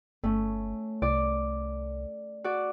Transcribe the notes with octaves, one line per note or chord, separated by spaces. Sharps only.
G1 A3 C#4
C2 D5
F#4 D5